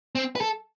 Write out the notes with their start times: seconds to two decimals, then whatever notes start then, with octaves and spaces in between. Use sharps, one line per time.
0.15 C4
0.36 B4
0.41 A4